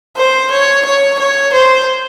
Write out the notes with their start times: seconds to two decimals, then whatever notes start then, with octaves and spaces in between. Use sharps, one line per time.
0.16 C5
0.51 C#5
0.85 C#5
1.19 C#5
1.53 C5